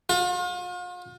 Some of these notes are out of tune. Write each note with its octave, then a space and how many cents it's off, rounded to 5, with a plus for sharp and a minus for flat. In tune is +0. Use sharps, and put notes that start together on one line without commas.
F4 +40